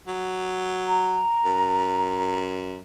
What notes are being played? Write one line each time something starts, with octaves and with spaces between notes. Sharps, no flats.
F#3
A#5
F#2